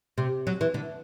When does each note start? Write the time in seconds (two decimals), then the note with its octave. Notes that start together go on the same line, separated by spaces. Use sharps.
0.18 C3
0.47 F#3
0.61 E3
0.74 D3